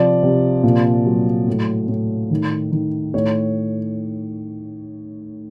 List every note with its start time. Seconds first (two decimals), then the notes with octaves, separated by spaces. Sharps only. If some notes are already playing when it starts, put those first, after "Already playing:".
Already playing: C3 F3 D5
0.23 C3
0.63 A#2
1.06 F#3
1.47 A2
1.88 A2
2.30 D#3
2.72 D#3
3.14 A2 C#5